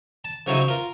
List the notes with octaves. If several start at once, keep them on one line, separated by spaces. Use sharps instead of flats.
A5
C#3 F3 F#3 D#4 E4 G#4
F4 A#4